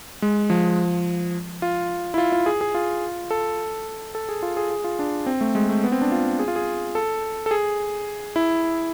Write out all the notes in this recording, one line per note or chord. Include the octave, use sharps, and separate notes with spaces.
G#3
F3
F4
E4
F4
F4
G#4
G#4
F4
A4
A4
G#4
F4
G#4
G#4
F4
D4
C4
A3
G#3
A3
B3
C4
D4
F4
G#4
F4
G#4
A4
A4
G#4
E4